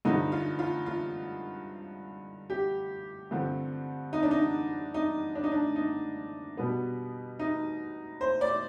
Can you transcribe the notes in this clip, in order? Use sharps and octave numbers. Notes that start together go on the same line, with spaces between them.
G2 D3 F3 D#4
F4
F4
F4
G4
G2 D3 F3 C4
D#4
D4
D#4
D#4
D4
D#4
D4
D#4
B2 G3 B3
D#4
C5
D5